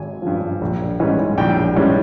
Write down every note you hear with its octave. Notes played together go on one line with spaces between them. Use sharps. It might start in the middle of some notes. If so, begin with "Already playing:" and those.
Already playing: G#1 G#5
G2 F3
A#1
G#2 E3 G3 C#4
A#1 G5
G#2 E3 G3 C#4